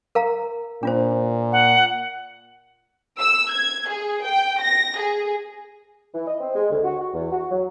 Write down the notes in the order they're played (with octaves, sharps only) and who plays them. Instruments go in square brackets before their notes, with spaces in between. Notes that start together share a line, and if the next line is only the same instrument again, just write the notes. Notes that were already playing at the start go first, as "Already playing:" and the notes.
[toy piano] A#4 F5 A#5
[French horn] A#2 [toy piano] D4 F4 C5
[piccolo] F#5
[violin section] E6
G#6
G#4
G5
A#6
G#4
[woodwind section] E3
D#5
C4
G#3
D2
F#4
F#4
E2
F#4
F#3